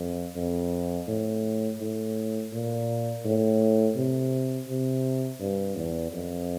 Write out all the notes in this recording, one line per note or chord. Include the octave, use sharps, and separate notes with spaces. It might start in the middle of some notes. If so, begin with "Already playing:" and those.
Already playing: F2
F2
A2
A2
A#2
A2
C3
C3
G2
E2
F2